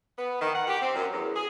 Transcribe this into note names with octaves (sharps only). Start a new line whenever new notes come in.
B3
D#3
F#5
G4
C4
F#2
E2
G#4